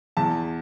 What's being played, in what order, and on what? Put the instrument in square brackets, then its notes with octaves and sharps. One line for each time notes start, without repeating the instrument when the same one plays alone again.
[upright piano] E2 A5